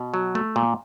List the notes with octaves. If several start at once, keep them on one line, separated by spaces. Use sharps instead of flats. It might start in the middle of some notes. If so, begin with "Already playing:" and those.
Already playing: B2
F#3
A3
A#2